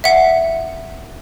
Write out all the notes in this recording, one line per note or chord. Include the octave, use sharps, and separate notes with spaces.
E5 F#5